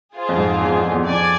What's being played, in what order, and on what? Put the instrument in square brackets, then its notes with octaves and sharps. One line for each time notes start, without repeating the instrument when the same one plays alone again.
[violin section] F4 G#4 C5
[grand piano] F2
G#2
E2
F2
E2
[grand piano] F2 [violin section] D5 G#5